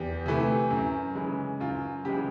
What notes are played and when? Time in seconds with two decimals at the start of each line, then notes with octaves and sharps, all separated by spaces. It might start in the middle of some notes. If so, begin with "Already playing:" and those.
Already playing: E2 G4
0.26 C3 E3 A3
0.70 F#2
1.15 C#3 E3 G#3
1.60 F#2 F4
2.05 C#3 E3 G#3 G4